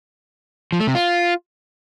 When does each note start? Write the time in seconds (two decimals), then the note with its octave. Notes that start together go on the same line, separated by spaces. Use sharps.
0.72 F3
0.80 A3
0.87 C3
0.95 F4